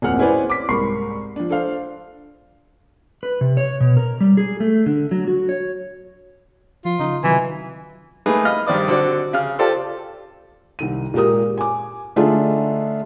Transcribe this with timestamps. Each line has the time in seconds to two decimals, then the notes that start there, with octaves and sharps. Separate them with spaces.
0.02 D1 F2 A#3 G#4 F#5 F6
0.19 C#4 E4 G#4 B4 C5 D5
0.50 D6 B6
0.69 C2 G#2 A#4 B5 C#6 C7
1.36 F3 D4
1.49 D4 A4 C5 F5
3.23 B4
3.41 C3
3.57 C#5
3.80 B2
3.97 A#4
4.20 G3
4.37 G#4
4.60 A3
4.86 D3
5.11 F#3
5.28 F#4
5.49 C#5
6.85 F3 F4
6.99 C#3 D#4
7.24 C3 D#3 E3 F#3 G#5
8.26 A3 A#3 D#4 G#4 B4
8.45 D#5 F5 B5 F6
8.67 G2 D#3 C5 D5 D#6
8.88 D3 C4 F#4 D5
9.33 C#3 F5 F6
9.59 F4 G4 A4 C5 D5 A5
10.79 C2 D#3 D#7
11.14 A#2 G#3 G4 A#4 D#6
11.58 G#5 D6
12.16 D3 A3 D4 D#4 F4 G#4